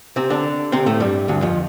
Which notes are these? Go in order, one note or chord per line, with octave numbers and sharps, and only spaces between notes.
C3 C4
D3 D4
C3 C4
A2 A3
G2 G3
D2 D3
F2 F3